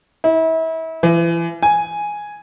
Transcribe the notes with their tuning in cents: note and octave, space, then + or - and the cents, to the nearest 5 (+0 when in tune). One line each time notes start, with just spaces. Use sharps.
E4 -35
E3 +35
G#5 +0